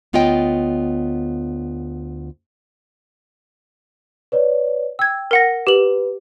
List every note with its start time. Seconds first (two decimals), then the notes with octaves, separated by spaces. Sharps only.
0.13 D2 B3 F4 C#5 D#5 G5
4.32 B4 C#5 D5
4.99 G5 E6 G#6
5.31 A#4 F#5 A#6
5.67 G4 B4 F#7